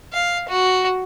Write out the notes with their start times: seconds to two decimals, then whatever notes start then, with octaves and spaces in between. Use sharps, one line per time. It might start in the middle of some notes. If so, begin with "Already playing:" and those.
0.13 F5
0.49 F#4